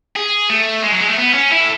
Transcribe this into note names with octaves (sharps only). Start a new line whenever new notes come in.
G#4
A3
G#3
F#3
G#3
A3
B3
C#4
E4
A4